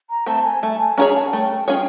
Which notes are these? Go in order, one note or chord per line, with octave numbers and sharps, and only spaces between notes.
A#5
A3 C4 A5
G#5
A3 A5
G#5
C#4 F4 G#4 C#5 A#5
A#5
A5
F#5
A3 G5
C#4 F4 G#4 C#5 G5